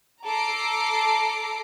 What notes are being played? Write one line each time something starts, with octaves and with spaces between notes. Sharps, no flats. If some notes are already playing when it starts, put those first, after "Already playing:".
A4 A#5 D6 C7 D7